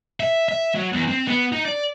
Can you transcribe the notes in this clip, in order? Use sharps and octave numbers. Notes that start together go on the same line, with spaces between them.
E5
E5
F#3
E2
C4
B3
D#4
D5